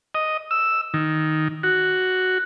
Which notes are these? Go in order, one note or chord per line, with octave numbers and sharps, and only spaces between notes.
D#5
E6
D#3
F#4